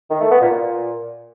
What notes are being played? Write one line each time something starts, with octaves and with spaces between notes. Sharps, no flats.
D#3
A3
B3
A#2
A#2